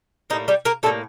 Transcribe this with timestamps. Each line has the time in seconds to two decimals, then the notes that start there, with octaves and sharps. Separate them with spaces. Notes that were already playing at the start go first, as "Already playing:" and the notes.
0.30 A2 G3 A#3 D#4
0.48 G3 G4
0.65 A#3 A#4
0.83 A2 G3 A3 A#3 A4